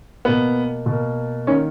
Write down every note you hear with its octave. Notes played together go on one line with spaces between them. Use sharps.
B2 A#3 B3
B2 A#3
D#3 A#3 C#4